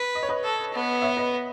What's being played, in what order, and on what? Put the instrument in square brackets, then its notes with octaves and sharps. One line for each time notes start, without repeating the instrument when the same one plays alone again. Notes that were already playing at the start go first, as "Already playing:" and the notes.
Already playing: [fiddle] B4
[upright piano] D#5
C#5
B4 D#5
[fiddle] A4
B3
[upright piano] C#5 E5
B4 D#5